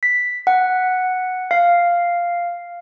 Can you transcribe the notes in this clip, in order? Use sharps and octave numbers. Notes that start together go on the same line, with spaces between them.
B6
F#5
F5